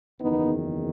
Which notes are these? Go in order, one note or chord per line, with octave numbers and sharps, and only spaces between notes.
F#1 E2 D#3 B3 D#4